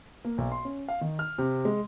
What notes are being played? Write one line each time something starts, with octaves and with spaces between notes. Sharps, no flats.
A#3
B1
C6
C#4
F5
D#3
F6
C3
G#3